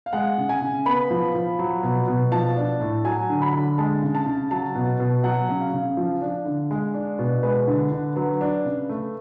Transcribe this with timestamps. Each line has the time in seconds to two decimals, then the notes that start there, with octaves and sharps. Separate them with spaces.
0.06 F5
0.13 G#3 F#5
0.38 C#3
0.49 G#5
0.62 C#3
0.86 B3 B5
1.10 F3
1.34 F3
1.59 F#3
1.83 B2
2.08 B2
2.32 F3 A5
2.56 D4
2.80 A2
3.05 F#3 G#5
3.29 D3
3.42 B5
3.53 D3
3.78 G#3 A5
4.02 C#3
4.15 A5
4.26 C#3
4.51 F#3 A5
4.75 B2
5.00 B2
5.24 F#3 F#5
5.49 C#3
5.61 F5
5.73 C#3
5.97 F3
6.21 D4
6.45 D3
6.71 G#3
6.94 D4
7.19 B2
7.43 G#3 B4
7.68 D3
7.92 D3
8.16 F#3 B4
8.41 D4
8.65 C#3
8.89 A3